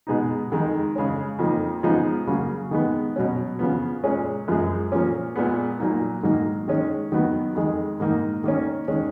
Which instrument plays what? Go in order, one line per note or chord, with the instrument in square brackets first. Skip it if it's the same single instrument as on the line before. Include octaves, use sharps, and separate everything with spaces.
[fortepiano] B2 G#3 B3 D#4
F2 D#3 G#3 D#4
C#3 G#3 C#4
F2 F3 A#3 D#4
C#3 F3 G#3 B3 D#4
C#3 F#3 A#3
D#3 G#3 B3
B2 F#3 C#4
C#3 F3 B3
A#2 G#3 C#4
F#2 F3 G#3
A#2 F3 A#3 C#4
A#2 G#3 B3
A#2 F#3 A#3 D#4
G#2 D#3 F#3 A#3
D#3 G#3 C#4
D#3 F#3 B3
F2 D#3 G#3
G#2 D#3 A#3 D#4
D#3 A#3 C#4
D#3 G#3 C#4